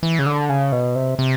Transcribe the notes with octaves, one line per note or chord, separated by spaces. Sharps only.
E3
C#3
D3
C#3
B2
C3
C3